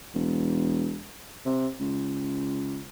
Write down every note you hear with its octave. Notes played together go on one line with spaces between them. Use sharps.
E1
C3
C#2